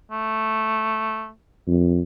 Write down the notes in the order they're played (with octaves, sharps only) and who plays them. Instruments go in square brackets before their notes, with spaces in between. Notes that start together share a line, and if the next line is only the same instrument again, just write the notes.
[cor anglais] A3
[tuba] F2